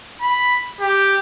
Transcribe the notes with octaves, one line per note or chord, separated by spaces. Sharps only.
B5
G4